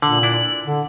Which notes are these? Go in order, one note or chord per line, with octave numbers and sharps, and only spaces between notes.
A#2 D3 F#7
D4 E4
D3